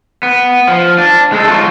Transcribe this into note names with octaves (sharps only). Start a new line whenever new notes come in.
B3
F3
D4
G#3 A4
F#3 F4